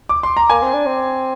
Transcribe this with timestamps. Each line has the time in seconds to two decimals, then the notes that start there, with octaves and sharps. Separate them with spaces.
0.09 D6
0.23 C6
0.37 A#5
0.50 A#3 G#5
0.62 C4
0.73 D4
0.86 C4